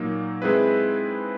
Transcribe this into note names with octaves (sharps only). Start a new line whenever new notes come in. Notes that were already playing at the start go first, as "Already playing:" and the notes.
Already playing: A#2 F#3 A#3 D#4
G#3 C4 E4 G#4 B4